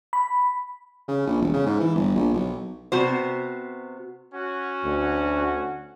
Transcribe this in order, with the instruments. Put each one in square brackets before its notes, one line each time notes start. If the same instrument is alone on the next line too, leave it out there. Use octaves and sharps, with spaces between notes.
[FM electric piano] B5
[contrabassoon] C#3
A#1
E1
C#3
G#2
E3
G1
A#1
B1
[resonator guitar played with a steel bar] C3 B3 C5 [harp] F#4
[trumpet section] C#4 F#4
[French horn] D2